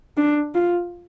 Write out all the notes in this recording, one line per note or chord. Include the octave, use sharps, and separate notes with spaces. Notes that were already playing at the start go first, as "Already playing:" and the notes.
D4
F4